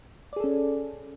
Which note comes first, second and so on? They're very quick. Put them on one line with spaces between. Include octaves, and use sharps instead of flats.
D5 G#4 A4 C#4